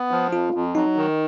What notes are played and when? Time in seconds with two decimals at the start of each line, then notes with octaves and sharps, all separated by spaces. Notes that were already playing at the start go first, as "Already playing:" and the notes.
Already playing: B3
0.11 F3
0.32 F2 F4
0.54 F2
0.75 F#3 D#4
0.97 D#3